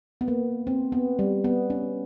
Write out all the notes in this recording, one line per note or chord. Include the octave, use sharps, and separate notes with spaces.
B3
A#3
C4
B3
G3
B3
C#4